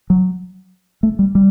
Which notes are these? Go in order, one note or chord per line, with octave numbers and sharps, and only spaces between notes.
F#3
A3
G3
G3